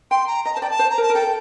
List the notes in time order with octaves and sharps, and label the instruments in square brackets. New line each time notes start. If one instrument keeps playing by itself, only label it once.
[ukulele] G5 [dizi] C6
[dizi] A#5
[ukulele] D#5 [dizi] A#5
[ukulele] C5 [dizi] A5
[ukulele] D5 [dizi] G5
[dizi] A5
[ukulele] C5
[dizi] A#5
[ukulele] A#4
[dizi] A5
[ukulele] A#4
[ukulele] A4 [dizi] G5